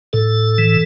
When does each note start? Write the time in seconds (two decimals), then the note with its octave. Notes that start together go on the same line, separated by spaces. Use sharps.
0.13 A2 A4
0.58 E3